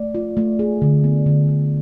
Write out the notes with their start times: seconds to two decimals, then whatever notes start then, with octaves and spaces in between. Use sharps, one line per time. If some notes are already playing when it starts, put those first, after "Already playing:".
Already playing: A3 D5
0.15 F4
0.37 A3
0.59 G#4
0.82 D3
1.04 B3
1.26 D3
1.48 D3